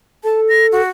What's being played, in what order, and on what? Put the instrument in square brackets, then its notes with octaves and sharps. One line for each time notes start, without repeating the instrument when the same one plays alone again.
[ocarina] A4 [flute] A5
[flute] A#6
F#4